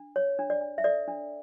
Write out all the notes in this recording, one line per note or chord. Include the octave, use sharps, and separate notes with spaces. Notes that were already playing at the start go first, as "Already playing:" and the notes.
Already playing: D4
C#5
D4
D5
D4
E5
A4 D5
D4